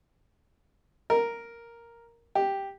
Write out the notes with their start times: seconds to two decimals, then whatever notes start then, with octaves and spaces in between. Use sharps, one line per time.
1.10 A#4
2.35 G4